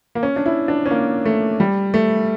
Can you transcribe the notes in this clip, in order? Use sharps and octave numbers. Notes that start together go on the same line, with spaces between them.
A#3
C#4
D4
E4
D4
C#4
A#3
A3
G3
A3